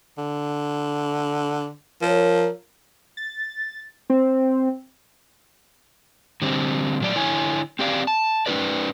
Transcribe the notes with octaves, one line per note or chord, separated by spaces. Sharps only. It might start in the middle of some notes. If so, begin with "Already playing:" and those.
D3
F3 A#4 C#5
A6
C4
D3 G3 C4
A#2 F#3 D5
D3 E4 C#5 G#5
C4 G4 D5 F5
A5
C#4 D#4 E4 G4 B4 D5